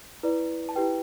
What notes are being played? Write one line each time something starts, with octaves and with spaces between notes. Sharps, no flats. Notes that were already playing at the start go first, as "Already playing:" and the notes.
E4 B4 D5
A5
E4 G4 B4 G5